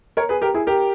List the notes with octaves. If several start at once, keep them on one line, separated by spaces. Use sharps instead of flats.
A#4 C#5
G#4 B4
G4 A#4
E4 G#4
G4 A#4